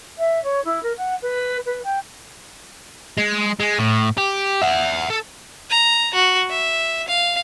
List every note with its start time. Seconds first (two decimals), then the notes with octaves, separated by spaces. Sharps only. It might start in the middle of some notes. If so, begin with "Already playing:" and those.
0.18 E5
0.43 C#5
0.64 E4
0.82 A#4
0.97 F#5
1.22 B4
1.65 B4
1.83 G5
3.18 G#3
3.60 G#3
3.79 A2
4.18 G4
4.62 E5 F#5
5.10 A4
5.70 A#5
6.14 F#4
6.50 E5
7.08 F5